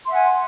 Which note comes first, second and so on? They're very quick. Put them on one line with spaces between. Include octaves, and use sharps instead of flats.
C6 E5 F#5 G#5